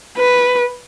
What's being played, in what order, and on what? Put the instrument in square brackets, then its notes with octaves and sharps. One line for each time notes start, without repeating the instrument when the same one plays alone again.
[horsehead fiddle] B4